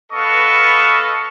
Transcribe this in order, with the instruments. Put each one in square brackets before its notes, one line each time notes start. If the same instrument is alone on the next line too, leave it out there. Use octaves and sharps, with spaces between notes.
[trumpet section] B3 A4 B4 D#5 F5 C#6